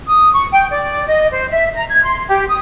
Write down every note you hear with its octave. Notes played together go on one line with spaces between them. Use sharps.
D#6
C#6
G5
D5
D#5
C5
E5
A#5
G#6
C6
G4
D#6